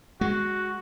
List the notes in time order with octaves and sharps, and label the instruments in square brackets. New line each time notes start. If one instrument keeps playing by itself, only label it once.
[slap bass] G#3 [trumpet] F#4